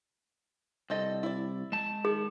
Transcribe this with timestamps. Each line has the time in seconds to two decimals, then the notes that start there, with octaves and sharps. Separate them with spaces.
0.90 C2 C4 A4 D#5
1.23 E4 D5
1.72 G#3 A5
2.05 D#3 G#4